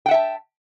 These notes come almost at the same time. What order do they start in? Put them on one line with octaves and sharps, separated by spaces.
G5 F#5 E5 A5